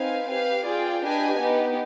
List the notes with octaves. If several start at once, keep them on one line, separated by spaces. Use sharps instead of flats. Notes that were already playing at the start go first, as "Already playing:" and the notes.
Already playing: C4 D#4 B4 F5 G#5
G4 B4 F5
F4 G#4 D5 G5
D4 G4 B4 D#5 G#5
B3 D#4 G4